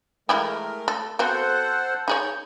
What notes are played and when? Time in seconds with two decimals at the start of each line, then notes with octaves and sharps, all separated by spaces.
0.29 E3 G#3 A3 E4 G4 A#4
0.88 A4
1.19 B3 C4 F#4 A4 C5 F#5
2.08 D#4 G#4 C#5 G6